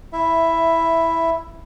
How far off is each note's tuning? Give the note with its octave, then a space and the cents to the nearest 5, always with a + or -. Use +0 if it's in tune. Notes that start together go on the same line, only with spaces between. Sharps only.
E4 +0 E5 +5